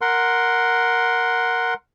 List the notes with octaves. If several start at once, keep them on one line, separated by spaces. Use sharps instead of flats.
A#4 F#5 C6